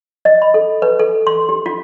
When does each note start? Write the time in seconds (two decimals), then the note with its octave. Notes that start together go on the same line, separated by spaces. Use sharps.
0.25 D#5
0.42 B5
0.54 A4
0.82 B4
0.99 A4
1.27 C6
1.49 G4
1.66 F4